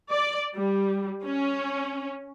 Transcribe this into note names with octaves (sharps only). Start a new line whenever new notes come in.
D5
G3
C#4